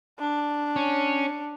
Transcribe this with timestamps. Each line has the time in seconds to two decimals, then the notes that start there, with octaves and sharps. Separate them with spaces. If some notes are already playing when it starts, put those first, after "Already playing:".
0.19 D4
0.76 C#4